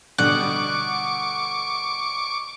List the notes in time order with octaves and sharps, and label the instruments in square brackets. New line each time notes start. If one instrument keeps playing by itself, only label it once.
[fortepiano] B2 D3 G3 [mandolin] F#5 [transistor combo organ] C#6 D6